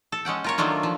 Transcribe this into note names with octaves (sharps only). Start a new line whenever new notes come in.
A4
G#3 C#4 F#5 G5
F4 A#4 C#5
D#3 F#3 A3 D4 F4
F3